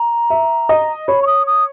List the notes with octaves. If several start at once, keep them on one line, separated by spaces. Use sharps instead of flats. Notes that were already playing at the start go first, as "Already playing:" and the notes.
Already playing: A#5
E5
D#5
C#5 B5
C#6
D#6
D#6